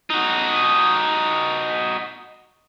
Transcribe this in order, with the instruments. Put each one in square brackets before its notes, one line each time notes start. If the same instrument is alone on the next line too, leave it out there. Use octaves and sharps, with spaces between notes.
[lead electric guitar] D#4 F#4